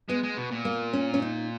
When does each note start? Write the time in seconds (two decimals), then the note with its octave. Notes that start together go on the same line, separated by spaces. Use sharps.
0.09 G#3 B3
0.23 G#3
0.37 B2
0.51 A#2
0.65 A#3
0.93 C#4
1.14 C#4
1.22 D#4